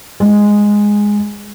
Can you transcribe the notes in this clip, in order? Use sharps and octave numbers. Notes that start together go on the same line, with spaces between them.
G#3